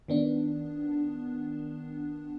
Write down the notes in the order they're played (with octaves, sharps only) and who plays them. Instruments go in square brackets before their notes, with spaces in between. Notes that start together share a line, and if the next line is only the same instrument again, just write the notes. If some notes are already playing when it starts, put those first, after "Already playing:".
[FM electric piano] D#3 B3 D4